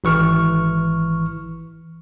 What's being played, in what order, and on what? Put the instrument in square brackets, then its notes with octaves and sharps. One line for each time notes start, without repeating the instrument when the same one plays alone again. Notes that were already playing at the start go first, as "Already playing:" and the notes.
[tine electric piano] G#1 E3 C#6 F6